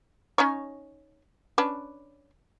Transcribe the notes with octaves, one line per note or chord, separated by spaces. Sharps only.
C#4 D#4 C#5
C#4 D4 B4